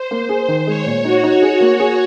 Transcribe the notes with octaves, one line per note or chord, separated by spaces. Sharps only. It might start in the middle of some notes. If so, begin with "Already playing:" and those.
Already playing: C5
A#3
G#4
D#3
G#3 C#5
A#2
D#4 F#4
D#4
G#4
A#3
G#4